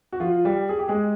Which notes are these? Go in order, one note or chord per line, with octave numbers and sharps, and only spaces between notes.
F#4
F3 F4
G3 G4
G#4
G4
G#3 G#4